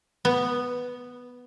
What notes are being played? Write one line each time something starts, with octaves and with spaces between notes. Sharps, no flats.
B3